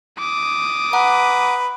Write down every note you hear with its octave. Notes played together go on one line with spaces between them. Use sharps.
D6 D#6
B4 F#5 A#5